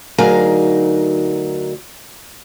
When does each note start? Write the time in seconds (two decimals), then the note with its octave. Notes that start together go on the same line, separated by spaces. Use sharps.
0.18 D2 F#3 D#4 G#4 A#4 F5